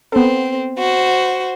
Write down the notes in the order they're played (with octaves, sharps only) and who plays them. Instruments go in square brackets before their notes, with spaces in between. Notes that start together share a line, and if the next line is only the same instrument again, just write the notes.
[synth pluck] B3 A4 [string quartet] C4
[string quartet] F#4 C5